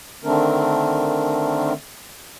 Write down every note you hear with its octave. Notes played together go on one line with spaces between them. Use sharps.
D3 D#3 A3 C4 D4 A#4